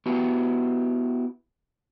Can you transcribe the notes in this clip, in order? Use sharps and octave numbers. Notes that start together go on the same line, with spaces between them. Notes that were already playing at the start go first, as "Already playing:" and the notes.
B3 E4 F#4 G4